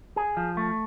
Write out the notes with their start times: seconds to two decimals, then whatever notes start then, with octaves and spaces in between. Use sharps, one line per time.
0.16 G#4
0.37 F3
0.57 A3